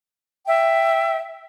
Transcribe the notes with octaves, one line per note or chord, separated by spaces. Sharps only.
E5 G5